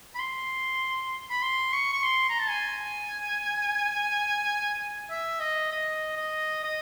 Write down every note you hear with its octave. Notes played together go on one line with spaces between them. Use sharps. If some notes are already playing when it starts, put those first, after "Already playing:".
B5
C6
B5
C6
C#6
C#6
C6
A#5
A5
G#5
E5
D#5
D#5
D#5
D#5